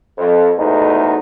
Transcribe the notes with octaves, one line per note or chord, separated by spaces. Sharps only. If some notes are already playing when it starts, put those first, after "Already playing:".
F2
A1 E2 G#2 B2 A3 D#4